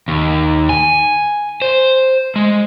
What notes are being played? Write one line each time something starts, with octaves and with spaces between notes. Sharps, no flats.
D#2
G#5
C5
G#3